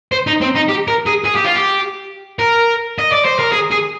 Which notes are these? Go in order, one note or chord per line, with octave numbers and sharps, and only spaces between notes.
C5
D#4
C4
D#4
G4
A#4
G#4
G#4
G4
F4
G4
A#4
D#5
D5
C5
A#4
G#4
G#4